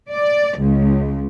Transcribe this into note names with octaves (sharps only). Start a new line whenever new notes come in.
D5
C#2